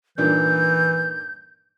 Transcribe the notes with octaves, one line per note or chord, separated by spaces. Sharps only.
G2 A#2 D#3 E3 G6